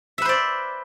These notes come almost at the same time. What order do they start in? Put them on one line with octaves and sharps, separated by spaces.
E5 B4 C5 D5